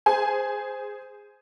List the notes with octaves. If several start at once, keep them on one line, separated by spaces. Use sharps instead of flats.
G#4 C5 G#5